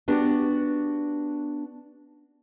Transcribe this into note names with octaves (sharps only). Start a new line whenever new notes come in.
B3 D4 F#4 G4